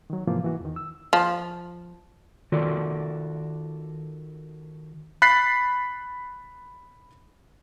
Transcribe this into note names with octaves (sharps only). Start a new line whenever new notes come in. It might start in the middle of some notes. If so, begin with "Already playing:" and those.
D#3 F#3
G#2 C3 E3 F3 A#3 F4
E3 F#4
E2 D#3
E6
F3
D#3 F4 F#4 A4 D5
B5 F#6 A6 B6 C7